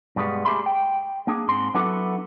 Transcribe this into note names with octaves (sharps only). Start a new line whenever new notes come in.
G2 B2 G3 G#3 B3
A3 G4 G#4 E5 B5 C6
G5
A#3 D4 G#4
G#2 C4 C6
F#3 B3 D4 E4 F#4 A4